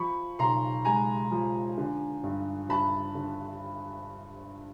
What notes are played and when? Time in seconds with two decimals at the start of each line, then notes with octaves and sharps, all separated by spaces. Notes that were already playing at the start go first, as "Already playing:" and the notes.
Already playing: F3 B5 C#6
0.39 B1 A#5 C6
0.85 G#3 G#5 A#5
1.31 F3
1.78 D3
2.23 G2
2.69 G2 A5 B5
3.15 D3